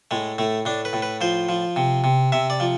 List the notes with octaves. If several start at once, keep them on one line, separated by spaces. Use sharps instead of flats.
A2 G#3
A2 A3
A2 D4
B4
A2
B4
F3 C5
F3
C3
C3
C3 E5
D5
F3